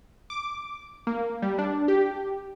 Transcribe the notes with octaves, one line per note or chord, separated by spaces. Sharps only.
D6
A#3
G3
D4
G4